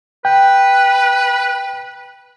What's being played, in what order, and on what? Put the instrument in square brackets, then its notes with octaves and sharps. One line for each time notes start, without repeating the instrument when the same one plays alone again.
[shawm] B4 [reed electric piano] G5